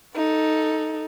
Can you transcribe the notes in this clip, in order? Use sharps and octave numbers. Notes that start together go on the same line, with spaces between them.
D#4 A4